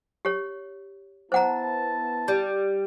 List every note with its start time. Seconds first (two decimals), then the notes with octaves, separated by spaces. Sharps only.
0.25 G4 C#5
1.32 B3 E4 C5 F#5 A5 A#5
2.28 G3